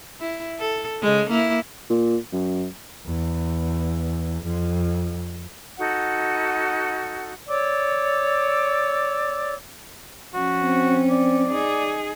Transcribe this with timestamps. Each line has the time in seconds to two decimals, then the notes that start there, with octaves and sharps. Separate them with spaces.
0.20 E4
0.59 A4
1.02 C#3 G#3
1.30 A#3 E4
1.90 A#2
2.33 F#2
3.06 E2
4.43 F2
5.78 D#4 F#4 A4 F#5
7.48 C#5 D5 D6 E6
10.34 F3 C#4 F#4
10.64 C4
11.10 D5
11.48 D#4 G#4